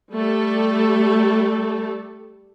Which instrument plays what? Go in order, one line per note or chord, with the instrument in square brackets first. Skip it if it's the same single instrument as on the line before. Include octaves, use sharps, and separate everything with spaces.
[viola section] G3 A3 A4